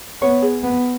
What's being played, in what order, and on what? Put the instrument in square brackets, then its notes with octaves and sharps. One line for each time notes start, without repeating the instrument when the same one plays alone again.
[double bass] B3 [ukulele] C#5
[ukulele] G#4
[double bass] B3